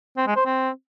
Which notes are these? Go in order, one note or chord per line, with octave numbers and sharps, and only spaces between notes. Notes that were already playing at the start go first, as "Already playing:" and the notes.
C4
G#3
C5
C4